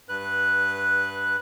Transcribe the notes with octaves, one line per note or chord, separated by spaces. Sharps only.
G2 B4 F#6